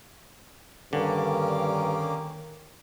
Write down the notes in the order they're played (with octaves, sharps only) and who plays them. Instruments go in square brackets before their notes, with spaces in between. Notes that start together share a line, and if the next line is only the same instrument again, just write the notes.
[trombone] G2 [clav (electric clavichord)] D3 [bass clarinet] D#3 [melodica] A#3 C#4 D6